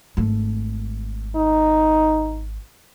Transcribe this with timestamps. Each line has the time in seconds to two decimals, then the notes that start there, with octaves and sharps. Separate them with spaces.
0.17 G#1 A3
1.36 D#4